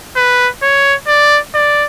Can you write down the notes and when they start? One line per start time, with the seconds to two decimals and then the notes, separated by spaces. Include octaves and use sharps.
0.16 B4
0.63 C#5
1.07 D5
1.55 D5